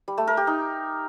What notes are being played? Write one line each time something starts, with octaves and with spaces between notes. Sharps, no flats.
G3
A3
A#4
G4
D#4